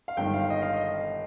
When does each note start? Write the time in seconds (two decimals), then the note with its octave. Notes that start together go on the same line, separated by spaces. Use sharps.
0.08 F5
0.17 G1 G2 D#3 G5
0.34 F5
0.50 D#5
0.62 F5
0.74 D#5